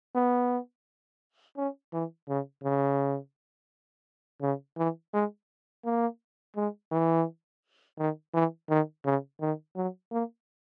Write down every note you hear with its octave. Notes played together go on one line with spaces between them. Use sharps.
B3
C#4
E3
C#3
C#3
C#3
E3
G#3
A#3
G#3
E3
D#3
E3
D#3
C#3
D#3
F#3
A#3